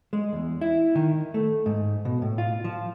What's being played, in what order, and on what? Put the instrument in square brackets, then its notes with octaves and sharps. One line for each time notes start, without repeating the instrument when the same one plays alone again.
[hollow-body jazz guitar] G#3
E2
E4
D#3
A3
G#2
B2
A2
F4
F3